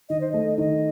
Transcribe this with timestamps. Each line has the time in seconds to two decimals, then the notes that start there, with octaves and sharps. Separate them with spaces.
0.09 D#3 D#5
0.21 C5
0.32 A3 D#5
0.58 D#3 D#5